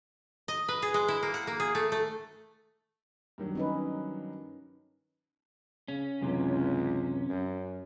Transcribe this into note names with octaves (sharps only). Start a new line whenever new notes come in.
D#5
B4
G#4
G#3
E4
A#3
F#5
A#3
G#4
A3
A3
G2 D#3 F#3
C#4 D#4 B4
C#3 C#4
C#2 F#2 C3 E3
F#2